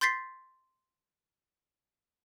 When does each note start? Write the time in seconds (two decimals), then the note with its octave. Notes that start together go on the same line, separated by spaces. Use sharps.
0.01 C6 G6 A6 B6 C7